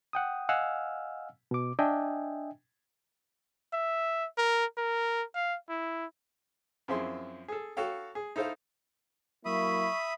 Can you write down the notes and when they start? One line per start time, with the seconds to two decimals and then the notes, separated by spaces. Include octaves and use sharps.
0.13 F#5 G5 D#6
0.49 D#5 F5 F#5 G#5 E6 F6
1.51 B2 D6
1.79 D4 D#5 E5 G5 G#5
3.73 E5
4.38 A#4
4.78 A#4
5.35 F5
5.69 E4
6.88 F#2 F3 C4 E4 G#4 C6
7.48 G#4 A4
7.77 F#4 A4 C#5 F5 G5
8.15 G#4
8.36 D#4 E4 A4 C5 F5
9.45 F#3 A#3 E4 E5 B5 C#6 D#6